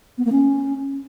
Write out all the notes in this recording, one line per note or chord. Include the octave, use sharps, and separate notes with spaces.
B3
A#3
C#4